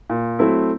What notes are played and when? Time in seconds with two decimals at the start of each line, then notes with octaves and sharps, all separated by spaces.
0.10 A#2
0.39 F#3 A3 C4 E4